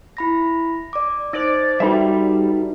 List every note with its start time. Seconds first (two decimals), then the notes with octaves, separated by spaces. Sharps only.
0.17 E4 B5 A#6
0.93 D5 D6
1.33 D#4 C5 D5
1.80 G3 D#4 F#4 A4 B4 E5